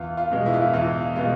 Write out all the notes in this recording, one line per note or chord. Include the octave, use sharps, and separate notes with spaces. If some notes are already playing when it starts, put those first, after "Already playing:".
Already playing: E2 F4
F4
B2 G#3
E4
F4
E4
E2 F4
B2 G#3 F4